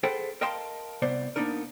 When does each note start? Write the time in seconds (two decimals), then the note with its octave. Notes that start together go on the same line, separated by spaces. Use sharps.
0.03 G#4 A4 B4 C5 F#5 G5
0.41 A#4 D#5 F5 G5 A5 C6
1.02 C2 C3 B3 C5 D5
1.36 A#3 B3 D4 D#4 A#4